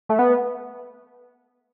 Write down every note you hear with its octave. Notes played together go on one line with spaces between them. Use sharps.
A3
B3